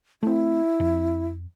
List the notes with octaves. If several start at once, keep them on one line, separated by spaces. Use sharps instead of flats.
A3 C4 E4
F2